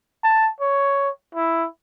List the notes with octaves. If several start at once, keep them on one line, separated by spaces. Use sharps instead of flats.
A5
C#5
E4